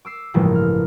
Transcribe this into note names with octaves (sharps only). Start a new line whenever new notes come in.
D6 E6 C7
A1 G2 C#3 F3 G#3 A#3
F6